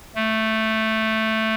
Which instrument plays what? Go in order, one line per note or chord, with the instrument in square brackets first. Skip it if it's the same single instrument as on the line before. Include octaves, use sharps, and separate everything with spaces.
[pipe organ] A3